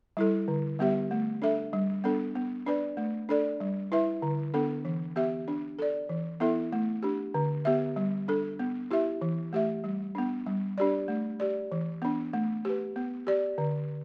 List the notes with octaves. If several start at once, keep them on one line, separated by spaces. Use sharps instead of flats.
G3 E4 A4
D3
G3 B3 G4 E5
A3
D4 A4 E5
G3
B3 D4 A4
B3
D4 B4 D5
A3
D4 A4 D5
G3
E4 B4 E5
D3
B3 D4 A4
E3
B3 G4 E5
D4
A4 D5
E3
B3 E4 A4 E5
A3
D4 G4
D3
B3 G4 E5
G3
D4 A4
B3
E4 G4 E5
E3
A3 G4 E5
G3
B3 D4
G3
D4 G4 D5
A3
G4 D5
E3
B3 D4
A3
G4 B4
B3
G4 D5
D3